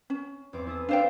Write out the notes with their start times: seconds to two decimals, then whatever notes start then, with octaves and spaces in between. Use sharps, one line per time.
0.10 C#4
0.53 E2 C4 D6
0.67 E4 A4 D#6
0.89 D4 C5 D5 E5 F5 G5